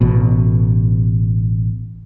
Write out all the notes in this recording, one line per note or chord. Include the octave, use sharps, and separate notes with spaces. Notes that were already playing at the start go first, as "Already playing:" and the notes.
A1 B2